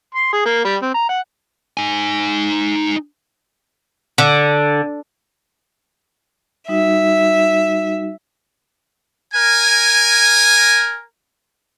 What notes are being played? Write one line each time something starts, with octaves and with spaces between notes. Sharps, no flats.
C6
G#4
A#3
G3
C4
A#5
F#5
D#4 G#5
D3
G3 D#4 F#4 E5
A#4 G#5